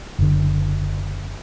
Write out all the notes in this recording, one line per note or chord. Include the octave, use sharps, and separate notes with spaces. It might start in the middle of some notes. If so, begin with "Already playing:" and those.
F#1 D3